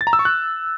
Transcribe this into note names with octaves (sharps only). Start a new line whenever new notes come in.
A6
A#5
E6
C#6
F#6